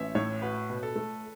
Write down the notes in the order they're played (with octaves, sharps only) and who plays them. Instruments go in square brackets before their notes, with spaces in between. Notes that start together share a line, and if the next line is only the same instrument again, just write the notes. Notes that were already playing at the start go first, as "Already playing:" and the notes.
Already playing: [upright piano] A1 [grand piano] C#5 E5
[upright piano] A2 [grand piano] C#5
[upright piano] F#4 [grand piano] B4
[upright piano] B2
[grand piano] A4
[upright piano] A3